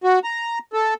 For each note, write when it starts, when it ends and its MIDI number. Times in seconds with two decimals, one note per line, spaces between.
0.04 0.19 66
0.24 0.59 82
0.73 0.94 69